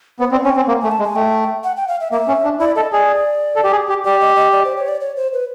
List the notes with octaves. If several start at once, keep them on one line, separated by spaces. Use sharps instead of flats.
B3 C5
C4 D5
C#4 G5
C4 G#5
A#3 F#5
A3 G#5
A5
G#3
G#5
A3 G5
F#5
G5
F5
E5
A#3 E5
C#4
D4
E4 D5
A4 D#5
G#4 D5
A4
G4
G#4
G4
G4 D5
D#5
D#5
D5
C5
C#5
D5
C#5
C5
B4